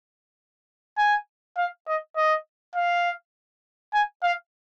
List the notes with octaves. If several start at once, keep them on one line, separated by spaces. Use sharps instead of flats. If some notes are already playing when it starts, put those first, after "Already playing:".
G#5
F5
D#5
D#5
F5
G#5
F5